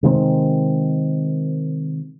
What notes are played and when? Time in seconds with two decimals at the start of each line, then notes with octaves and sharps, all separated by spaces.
0.03 C3 D#3 G#3 C4